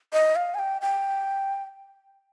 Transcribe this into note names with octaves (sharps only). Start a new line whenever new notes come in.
D#5
F5
G#5
G5
G5